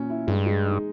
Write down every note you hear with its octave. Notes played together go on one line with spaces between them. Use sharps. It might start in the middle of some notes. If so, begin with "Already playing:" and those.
Already playing: A#2 C#4
E4
G2 G#3
G#3
D#4